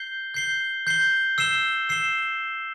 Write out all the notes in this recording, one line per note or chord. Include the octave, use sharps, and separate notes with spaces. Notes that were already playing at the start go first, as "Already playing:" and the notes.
Already playing: G6 C7 G7
G6 C7 G7
G6 C7 G7
E6 C7 E7 G7
E6 C7 E7 G7